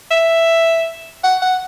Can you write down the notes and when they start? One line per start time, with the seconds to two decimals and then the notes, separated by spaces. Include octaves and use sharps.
0.11 E5
1.24 F#5
1.42 F#5